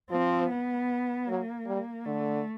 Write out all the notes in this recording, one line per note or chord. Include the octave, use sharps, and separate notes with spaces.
F3 C4
B3
F#3 A#3
G3
D3 A3